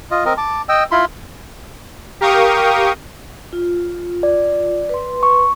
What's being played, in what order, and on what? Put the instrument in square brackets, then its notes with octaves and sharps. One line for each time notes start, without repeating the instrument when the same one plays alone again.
[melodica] F4 D#5
C4 A#4 D#5
A5 D6
D#5 G5 E6
E4 F4 B5 C6
[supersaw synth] G4 A#4 F5 G5 C#6 D#6
[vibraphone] F4
[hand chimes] D5
[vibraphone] B4 C6
[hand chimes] C#6